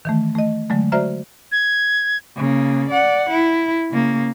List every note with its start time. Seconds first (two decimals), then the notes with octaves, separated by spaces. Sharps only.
0.05 D#3 E3 A3
0.35 A3 D#5
0.70 D3 F#3 G#3 A3
0.92 F#4 C5 D5 E5 A#5 F6
1.52 G#6
2.37 C#3 A#3
2.89 D5 F#5
3.30 E4
3.91 C#3 A#3